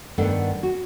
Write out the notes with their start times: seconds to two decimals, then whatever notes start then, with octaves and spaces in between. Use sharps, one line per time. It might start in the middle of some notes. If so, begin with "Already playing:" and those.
0.18 G2 D#3 A3 B3 A4 F#5
0.63 F#4